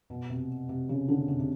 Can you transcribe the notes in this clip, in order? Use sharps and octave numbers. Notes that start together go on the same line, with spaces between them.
B2
C3
C3
C#3
D3
C3
C3